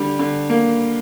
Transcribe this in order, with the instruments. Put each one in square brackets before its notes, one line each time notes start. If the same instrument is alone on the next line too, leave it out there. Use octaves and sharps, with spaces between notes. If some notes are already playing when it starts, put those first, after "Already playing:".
Already playing: [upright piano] D3 G3
D3
A#3